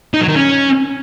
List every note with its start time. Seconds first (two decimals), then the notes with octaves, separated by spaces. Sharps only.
0.14 D#4
0.21 F#3
0.28 D#3
0.36 C#4